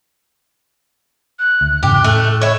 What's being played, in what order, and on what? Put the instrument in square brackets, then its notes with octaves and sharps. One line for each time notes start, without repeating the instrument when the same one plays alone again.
[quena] F#6
[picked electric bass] D2
[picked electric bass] E2 G#2 C#3 [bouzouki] G4
[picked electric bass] A2 [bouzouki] A3
[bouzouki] E4 C#5